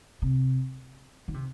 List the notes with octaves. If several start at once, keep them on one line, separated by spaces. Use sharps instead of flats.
C3
D#3
C3